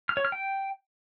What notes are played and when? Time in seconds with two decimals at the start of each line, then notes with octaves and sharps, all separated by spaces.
0.09 F6
0.17 C#5
0.25 F6
0.32 G5